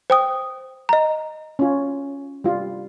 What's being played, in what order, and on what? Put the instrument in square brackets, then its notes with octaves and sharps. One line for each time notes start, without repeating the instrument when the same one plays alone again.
[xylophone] C5 G5 D#6
D#5 A#5
[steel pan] C#4 F4
G3 F4